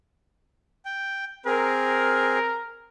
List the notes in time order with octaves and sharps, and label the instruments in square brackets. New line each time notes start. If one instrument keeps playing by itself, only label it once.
[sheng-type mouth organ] G5
[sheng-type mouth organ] C4 G#4 [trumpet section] A#4